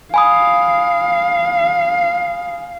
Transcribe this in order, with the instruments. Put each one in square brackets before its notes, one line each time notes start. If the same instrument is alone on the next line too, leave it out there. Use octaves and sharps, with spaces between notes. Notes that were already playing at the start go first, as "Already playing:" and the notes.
[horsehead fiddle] F5 [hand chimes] G#5 B5 D#6